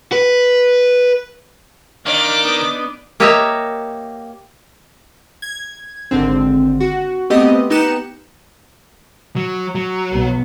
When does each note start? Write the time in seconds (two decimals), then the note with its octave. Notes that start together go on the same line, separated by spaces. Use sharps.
0.13 B4
2.06 D#3 D4 D5 F5 D6
2.44 B3 D4 D#4
3.20 A#3 G4 C#5 D#5 E5 A#5
5.42 G#6
6.11 G#1 D3 C4
6.80 F#4
7.30 A3 B3 C4 G4 D#5
7.70 B3 D#4 G4 F#6 C#7 E7
9.36 F#3
9.75 F#3
10.12 B1 B3